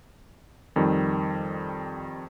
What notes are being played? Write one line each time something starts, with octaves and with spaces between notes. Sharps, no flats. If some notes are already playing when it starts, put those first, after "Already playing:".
F2 D#3 G3